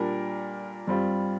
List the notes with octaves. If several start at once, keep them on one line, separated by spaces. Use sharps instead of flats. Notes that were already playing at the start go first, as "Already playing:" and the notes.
Already playing: A#2 G3 D4 A#4
G2 G3 C4 F4